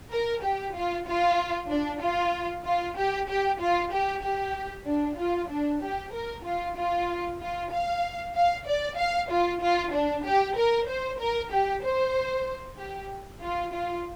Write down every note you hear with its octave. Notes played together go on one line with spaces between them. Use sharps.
A#4
G4
F4
F4
D4
F4
F4
G4
G4
F4
G4
G4
D4
F4
D4
G4
A#4
F4
F4
F4
F5
F5
D5
F5
F4
F4
D4
G4
A#4
C5
A#4
G4
C5
G4
F4
F4